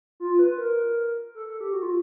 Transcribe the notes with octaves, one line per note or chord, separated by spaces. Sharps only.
F4
B4
A#4
A4
A4
G4
F#4
F4